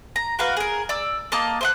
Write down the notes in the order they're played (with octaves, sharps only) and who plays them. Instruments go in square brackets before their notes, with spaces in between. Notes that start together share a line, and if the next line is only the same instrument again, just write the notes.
[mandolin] A#5
F#4 A#4 B4 F5
G#4 A#4
D5 E6
A#3 D#5 A5
C5 D#5 F#5